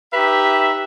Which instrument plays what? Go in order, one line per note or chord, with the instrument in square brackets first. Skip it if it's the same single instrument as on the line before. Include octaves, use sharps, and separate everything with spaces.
[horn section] D#4 G4 B4 E5